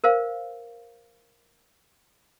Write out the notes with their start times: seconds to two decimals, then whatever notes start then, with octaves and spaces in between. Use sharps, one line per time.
0.04 A#4 C5 F5